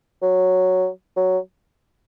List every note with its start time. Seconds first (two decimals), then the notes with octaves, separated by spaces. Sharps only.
0.22 F#3
1.17 F#3